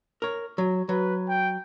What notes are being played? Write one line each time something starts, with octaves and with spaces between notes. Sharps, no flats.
A#4 C#5
F#3
F#3 B4
G5